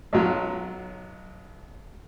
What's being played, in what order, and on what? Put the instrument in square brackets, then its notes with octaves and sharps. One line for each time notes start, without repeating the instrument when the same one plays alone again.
[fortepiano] B1 F#3 F4